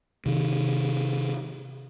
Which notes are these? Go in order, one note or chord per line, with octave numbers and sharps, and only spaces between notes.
C3 D#3